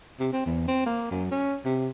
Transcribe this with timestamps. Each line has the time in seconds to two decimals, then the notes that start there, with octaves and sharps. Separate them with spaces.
0.20 C3
0.33 C4
0.46 E2
0.68 C4
0.86 A#3
1.11 F#2
1.31 C#4
1.65 C3